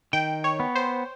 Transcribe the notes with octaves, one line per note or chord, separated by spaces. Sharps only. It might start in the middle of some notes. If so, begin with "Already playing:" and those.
D#3 G5
C#5
B3
C5